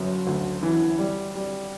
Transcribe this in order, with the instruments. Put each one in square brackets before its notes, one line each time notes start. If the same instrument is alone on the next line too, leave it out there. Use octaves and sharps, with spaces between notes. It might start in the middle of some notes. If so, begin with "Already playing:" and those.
Already playing: [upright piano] G1 F#2
D2
E3
G3
G3